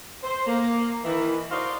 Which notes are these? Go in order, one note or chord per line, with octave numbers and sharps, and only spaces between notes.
C5
A#3
D#3 E3
D#4 F#4 A#4 C5 D5 F5